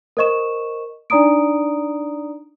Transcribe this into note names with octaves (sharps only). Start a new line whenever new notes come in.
A#4 C5 D#5 C#6 E7
D4 D#4 D5 A#5 D#6 D7